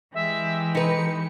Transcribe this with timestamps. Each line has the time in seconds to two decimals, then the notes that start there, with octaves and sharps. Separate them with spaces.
0.14 E3 G#3 G4 E5
0.75 D#4 B4 C#7